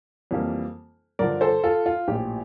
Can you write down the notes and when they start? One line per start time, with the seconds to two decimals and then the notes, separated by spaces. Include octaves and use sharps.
0.31 F2 E3 G3 A#3
1.19 G2 D3 F3 A#4 D5
1.41 A4 C5
1.64 F4 A4
1.86 F4
2.08 A#1 A2 F3 G4